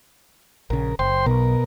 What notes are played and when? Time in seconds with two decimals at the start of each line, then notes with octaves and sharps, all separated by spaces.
0.70 A#1 C#3 A#4
0.99 F#1 C5 G5 C6
1.26 B1 B2 A#4